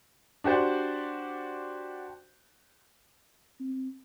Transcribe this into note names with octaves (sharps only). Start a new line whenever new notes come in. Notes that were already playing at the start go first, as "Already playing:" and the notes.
D4 F#4 G4 C5 D5
C4